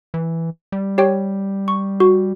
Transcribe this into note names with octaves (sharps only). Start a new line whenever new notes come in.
E3
G3
G4 C#5 G5
C#6
F#4